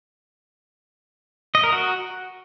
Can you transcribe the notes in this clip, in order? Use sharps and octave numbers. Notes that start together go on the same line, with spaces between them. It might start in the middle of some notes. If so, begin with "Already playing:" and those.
D#5
A#4
F#4